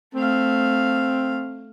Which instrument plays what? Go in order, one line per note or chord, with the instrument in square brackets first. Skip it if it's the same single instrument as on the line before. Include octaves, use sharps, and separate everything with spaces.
[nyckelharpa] A3 F5 [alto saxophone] C4